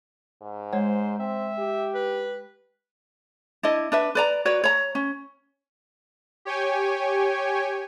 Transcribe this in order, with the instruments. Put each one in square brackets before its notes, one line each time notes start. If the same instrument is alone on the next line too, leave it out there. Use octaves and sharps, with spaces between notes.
[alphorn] G#2
[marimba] G#3 C#5 F#5 [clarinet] C5
[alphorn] C4 [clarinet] E5
[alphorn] G4
[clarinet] B4
[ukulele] D4 E4 D#5
D4 B4 E5
B4 D5 A#5
F#4 B4 C#5 D5
C#5 A#5
C#4
[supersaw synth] G4 C#5 G5 G#5